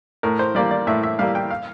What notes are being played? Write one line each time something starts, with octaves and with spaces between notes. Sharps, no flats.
A2 A#4
C5
G3 A#3 D5
D5
A2 E5
E5
G3 A#3 F5
G5
F5